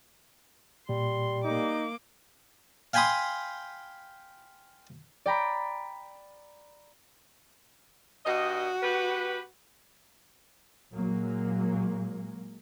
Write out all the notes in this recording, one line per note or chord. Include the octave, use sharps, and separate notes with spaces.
A#2 G3 C6
A#3 D#4 D6
F5 G5 G#5 B5 C6 D#6
D5 G5 A#5 B5
G2 F#4 D#5
B3 G4 B4
A#2 F#3 G#3 A#3